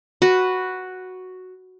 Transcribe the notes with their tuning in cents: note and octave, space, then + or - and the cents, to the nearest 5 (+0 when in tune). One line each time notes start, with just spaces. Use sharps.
F#4 +0 B4 +0